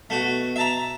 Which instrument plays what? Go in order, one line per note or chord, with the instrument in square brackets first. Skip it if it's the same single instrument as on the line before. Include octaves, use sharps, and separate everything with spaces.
[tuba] B2 [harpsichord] A3 F#4
[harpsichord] E5 A5 A#5